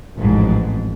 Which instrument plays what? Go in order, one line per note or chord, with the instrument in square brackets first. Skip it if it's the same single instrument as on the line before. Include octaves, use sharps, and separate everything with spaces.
[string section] A1 F2 G#2